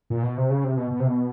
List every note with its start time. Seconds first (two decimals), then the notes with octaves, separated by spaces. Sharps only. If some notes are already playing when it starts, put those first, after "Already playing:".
0.10 A#2
0.23 B2
0.37 C3
0.50 C#3
0.64 C3
0.77 B2
0.91 B2
1.00 C3
1.08 B2